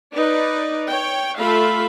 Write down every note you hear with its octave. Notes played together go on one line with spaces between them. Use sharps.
D#4 B4 D5
C#5 G5
A3 F4 A4 E5 F5 B5